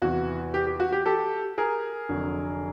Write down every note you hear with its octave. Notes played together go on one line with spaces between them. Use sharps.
E2 C3 E3 F#4
G4
G4
F#4
G4
G4 A4
G#4 A#4
F1 F2 D3 F#3